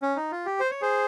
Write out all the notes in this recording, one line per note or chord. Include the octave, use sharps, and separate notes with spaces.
C#4
D#4
F4
G4
C5
C#5
G#4 C5